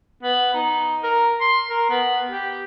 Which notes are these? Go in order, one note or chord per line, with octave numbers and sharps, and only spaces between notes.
B3
D#4
A#4
C6
A#4
B3
G4